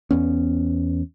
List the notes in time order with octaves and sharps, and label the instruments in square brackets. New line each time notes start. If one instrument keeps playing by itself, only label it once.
[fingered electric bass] E2 B3 C#4